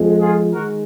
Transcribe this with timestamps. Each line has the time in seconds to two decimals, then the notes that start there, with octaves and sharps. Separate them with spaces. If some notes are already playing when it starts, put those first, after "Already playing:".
Already playing: F2 F3 G#3
0.21 F4 G#4
0.53 D#3 G#3 F#4 A#4